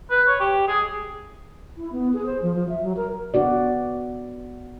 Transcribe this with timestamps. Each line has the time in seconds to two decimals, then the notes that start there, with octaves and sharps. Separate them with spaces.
0.11 B4
0.28 C#5
0.40 G4
0.68 G#4
1.76 E4
1.92 B3
2.13 G#4
2.26 C5
2.42 F3
2.55 F3
2.69 E5
2.83 F#3
2.96 A#4
3.34 B3 D4 F#4 D5